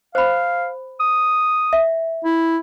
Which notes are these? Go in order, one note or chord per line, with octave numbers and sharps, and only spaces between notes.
C5 F5 B5
D#6
E5
E4